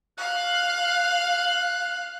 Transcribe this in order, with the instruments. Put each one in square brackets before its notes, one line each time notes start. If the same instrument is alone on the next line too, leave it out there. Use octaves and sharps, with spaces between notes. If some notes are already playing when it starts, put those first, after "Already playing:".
[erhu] F5 [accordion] F#6